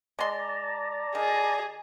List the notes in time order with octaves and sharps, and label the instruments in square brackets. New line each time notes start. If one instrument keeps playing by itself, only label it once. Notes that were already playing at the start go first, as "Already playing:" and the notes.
[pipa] G#3 C6 [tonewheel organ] D5 A5 A#5
[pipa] D#3 [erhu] G#4